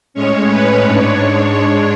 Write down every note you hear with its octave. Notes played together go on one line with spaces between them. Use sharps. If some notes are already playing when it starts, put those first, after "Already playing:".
A2 G#3 C#4 C#5
B4
G#2 G#3 D4 C#5